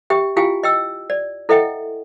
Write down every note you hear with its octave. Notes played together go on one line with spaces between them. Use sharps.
G4 E5 G5
E4 F4 G4 F5 G5 G#5
D#5 G5 E6
D5
E4 A4 D#5 E5 F#5 G5